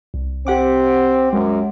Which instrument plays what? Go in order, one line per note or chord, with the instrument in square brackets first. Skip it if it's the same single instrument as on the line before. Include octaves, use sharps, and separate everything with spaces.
[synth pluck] C2
[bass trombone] C4 [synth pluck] G4 F#5 D6
[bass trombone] F#2 [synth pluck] G#3